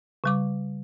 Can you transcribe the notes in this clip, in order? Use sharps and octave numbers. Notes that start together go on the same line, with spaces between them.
C#3 G3 D6